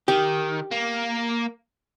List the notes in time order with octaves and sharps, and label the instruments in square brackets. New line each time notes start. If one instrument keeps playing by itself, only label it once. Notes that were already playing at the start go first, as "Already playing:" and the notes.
[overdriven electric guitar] D#3 [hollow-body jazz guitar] G4
[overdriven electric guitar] A#3